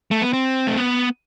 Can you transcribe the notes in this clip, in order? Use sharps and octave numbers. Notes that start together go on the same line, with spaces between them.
A3
B3
C4
A3
B3